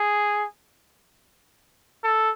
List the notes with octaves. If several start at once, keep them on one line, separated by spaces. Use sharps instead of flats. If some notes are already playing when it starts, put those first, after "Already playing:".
Already playing: G#4
A4